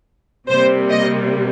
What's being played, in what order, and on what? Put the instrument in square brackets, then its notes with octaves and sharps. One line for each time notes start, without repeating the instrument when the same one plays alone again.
[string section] C3 G3 A#3 C5
D#5